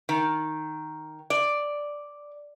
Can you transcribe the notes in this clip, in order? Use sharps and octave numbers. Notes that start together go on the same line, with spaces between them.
D#3
D5